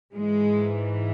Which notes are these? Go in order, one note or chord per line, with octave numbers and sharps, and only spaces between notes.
G#2 E3 G#3